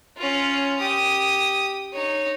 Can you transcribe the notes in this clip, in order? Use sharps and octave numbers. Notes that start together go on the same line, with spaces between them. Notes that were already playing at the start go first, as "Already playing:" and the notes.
C#4 F4
G4 D#6
D#4 C#5